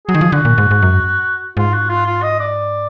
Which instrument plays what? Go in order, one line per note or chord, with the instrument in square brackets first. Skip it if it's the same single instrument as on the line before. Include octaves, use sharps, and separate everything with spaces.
[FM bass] F#3 [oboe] G#4
[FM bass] D#3
F3
[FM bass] D3 [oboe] F#4
[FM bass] A#2
G#2
G#2
F#2
[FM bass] G#2 [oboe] F4
[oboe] F#4
F4
F4
D#5
D5